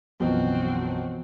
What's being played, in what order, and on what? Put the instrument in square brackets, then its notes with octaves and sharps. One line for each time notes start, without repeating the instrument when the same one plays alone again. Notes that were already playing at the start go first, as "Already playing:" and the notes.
[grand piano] B1 F#2 [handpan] E3 F3 B3 [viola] C4 F#4